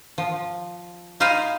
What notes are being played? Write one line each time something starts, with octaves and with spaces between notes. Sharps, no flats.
F3
D#4 F4 C5 F5 G#5 B5